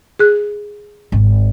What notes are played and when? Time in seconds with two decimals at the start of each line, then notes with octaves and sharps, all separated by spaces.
0.19 G#4 F#6
1.12 G#1